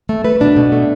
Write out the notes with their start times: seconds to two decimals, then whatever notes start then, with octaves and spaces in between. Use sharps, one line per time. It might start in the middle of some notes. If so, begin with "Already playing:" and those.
0.09 A3
0.24 A3 B4
0.40 B2 D4
0.57 B2
0.72 A3